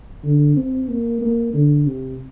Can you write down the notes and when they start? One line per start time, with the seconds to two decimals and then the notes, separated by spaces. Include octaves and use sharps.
0.24 D3
0.57 C4
0.89 A#3
1.22 A#3
1.54 D3
1.87 C3